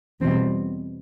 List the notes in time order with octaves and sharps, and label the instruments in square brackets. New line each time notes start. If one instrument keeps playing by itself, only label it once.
[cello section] E2 B2 G3 C4